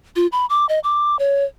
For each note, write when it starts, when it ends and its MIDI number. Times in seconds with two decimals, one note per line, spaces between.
0.16 0.27 65
0.32 0.46 83
0.50 0.66 86
0.69 0.79 75
0.84 1.18 86
1.19 1.44 73